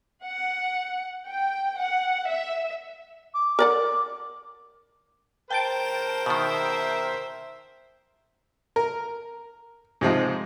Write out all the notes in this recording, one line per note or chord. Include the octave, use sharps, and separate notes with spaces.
F#5
G5
F#5
E5
D6
A#4 D5 F#5
A#4 C5 G5 A5 D7
B2 D#3 E5
A#4
G#2 C3 F3 G#3